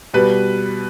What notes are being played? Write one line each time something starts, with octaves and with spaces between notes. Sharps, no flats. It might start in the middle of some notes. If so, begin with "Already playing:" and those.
B2 G3 B4